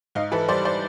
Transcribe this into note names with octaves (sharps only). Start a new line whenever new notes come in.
G#2 D#5 F5
E3 A4 B4
G3 C5 D5
C5 D5